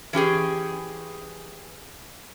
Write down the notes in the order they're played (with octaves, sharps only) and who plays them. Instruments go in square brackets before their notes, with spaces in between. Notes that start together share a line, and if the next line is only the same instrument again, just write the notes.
[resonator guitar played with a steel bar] E3 C#4 G4 G#4